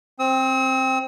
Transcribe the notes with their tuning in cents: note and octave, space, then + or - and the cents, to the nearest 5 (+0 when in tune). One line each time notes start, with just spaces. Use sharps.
C4 +10 E6 -45